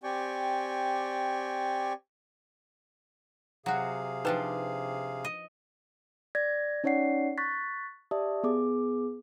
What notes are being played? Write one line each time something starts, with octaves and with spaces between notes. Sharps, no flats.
C4 G4 D5 G5 G#5 C#6
C3 F#3 F#4 G#4 F5
F3 D4 D#4 B4 C5 G5
D#5
D5 G#6 A#6
C#4 D#4 C#5 D5 F#5 C7
C#6 F#6 A6 B6
G4 D5 E5 A5 D#6
B3 G#4 D6